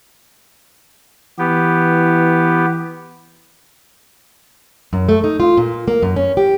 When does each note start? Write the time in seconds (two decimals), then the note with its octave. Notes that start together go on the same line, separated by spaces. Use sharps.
1.39 E3 B3 G4
4.93 F#2
5.09 A3
5.24 D#4
5.40 F4
5.57 A#2
5.88 A#3
6.02 F#2
6.16 C#4
6.37 G4